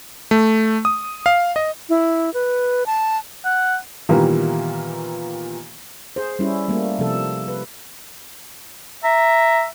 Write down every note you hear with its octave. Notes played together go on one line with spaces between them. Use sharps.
A3
D#6
F5
D#5
E4
B4
A5
F#5
A#2 D#3 E3 G3 A#3 B3
G#4 C5
G3 C#4 E4
G3 A3 A#3
C3 F3 A4
B4
E5 A#5